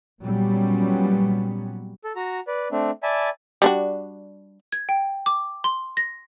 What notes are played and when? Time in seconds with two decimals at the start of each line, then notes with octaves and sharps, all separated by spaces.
0.22 A#2 F#3 G3 B3 C#4
2.04 A4
2.16 F#4 A#5
2.47 B4 D5
2.72 A3 C4 D4
3.03 D5 E5 G#5 A5 B5
3.62 G3 D4 F#4
4.72 G#6
4.89 G5
5.26 D6
5.64 C6
5.97 A#6